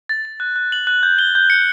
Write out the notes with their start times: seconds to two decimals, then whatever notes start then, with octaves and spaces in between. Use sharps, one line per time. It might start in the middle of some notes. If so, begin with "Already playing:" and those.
0.09 A6
0.25 A6
0.40 F#6
0.56 F#6
0.72 F#7
0.87 F#6
1.03 G6
1.19 G7
1.35 G6
1.50 C#7